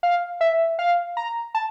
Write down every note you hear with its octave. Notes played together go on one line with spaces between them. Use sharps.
F5
E5
F5
A#5
A5